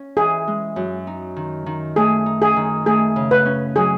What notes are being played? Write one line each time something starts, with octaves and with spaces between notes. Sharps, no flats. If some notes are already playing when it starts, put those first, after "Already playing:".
Already playing: C#4
E3 G#4
G#3
F#2
D#4
D#3
D#3
A3 G#4
D#4
G#4
D#3
A3 G#4
C#3
B4
C#4
F#3 G#4